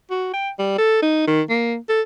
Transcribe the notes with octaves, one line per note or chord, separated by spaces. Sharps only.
F#4
G5
G3
A4
D#4
D#3
A#3
A4